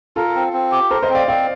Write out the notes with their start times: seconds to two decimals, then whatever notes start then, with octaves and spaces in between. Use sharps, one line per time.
0.16 F4 A4 A#4
0.35 C4
0.53 C4
0.72 G4
0.90 A4 A#4 C5
1.03 C5 D#5
1.09 C4
1.15 D5 F5
1.28 C4 D5 F5